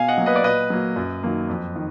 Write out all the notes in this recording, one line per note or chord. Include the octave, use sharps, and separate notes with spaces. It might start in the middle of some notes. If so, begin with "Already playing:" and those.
Already playing: B2 F5 G#5
D#5 F#5
F#3 A#3
B4 D#5
D5
A#2 B4 D#5
F#3 A#3
F#2
D#3 F#3 A#3
F2
D#3